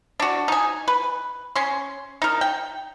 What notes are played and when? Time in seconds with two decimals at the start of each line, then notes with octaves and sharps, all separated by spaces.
0.20 D4 F#4
0.48 D#4 G#5
0.88 B4
1.56 C#4 C6
2.22 D#4 A#4
2.41 G5